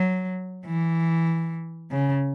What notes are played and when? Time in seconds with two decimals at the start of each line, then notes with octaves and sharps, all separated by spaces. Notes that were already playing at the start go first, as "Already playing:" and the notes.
Already playing: F#3
0.66 E3
1.91 C#3